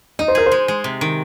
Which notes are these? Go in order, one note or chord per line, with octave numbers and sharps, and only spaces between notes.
D#4 D#5
C5
G#4 A#4
C5
G#3
G#3
C3
D#3